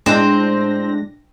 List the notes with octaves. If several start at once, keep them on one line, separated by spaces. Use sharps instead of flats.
A2 G#3 C4 D4 A#6